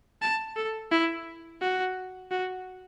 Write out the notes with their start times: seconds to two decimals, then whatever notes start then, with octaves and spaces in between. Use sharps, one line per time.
0.22 A5
0.56 A4
0.91 E4
1.61 F#4
2.31 F#4